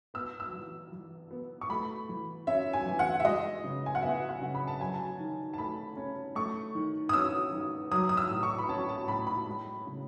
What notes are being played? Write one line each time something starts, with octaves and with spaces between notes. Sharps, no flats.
B3 E6
E6
E3
E3
B3
C#6
A3 B5
E3
C#4 E5
G#5
E3
F#5
E5
G#3 D#5
C#3
G#5
F#5
B3 E5
F#5
C#3
B5
A5
F#3 G#5
A5
D#3
A5
A3 B5
C#4
A3 C#6
D#3
D#6
C#4 E6
D#3
F#3 D#6
D#6
E6
A2
C#6
B5
C#4 A5
A5
A2 B5
B5
G#3
C#3